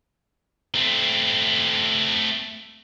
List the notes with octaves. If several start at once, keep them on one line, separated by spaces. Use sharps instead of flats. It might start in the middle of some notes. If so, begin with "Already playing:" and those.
A3 C4